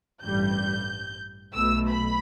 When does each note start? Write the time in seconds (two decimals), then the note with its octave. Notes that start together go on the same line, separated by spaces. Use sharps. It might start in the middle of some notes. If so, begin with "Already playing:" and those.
0.23 A1 G2 G3 G6
1.54 B1 B2 A3 E6
1.89 B5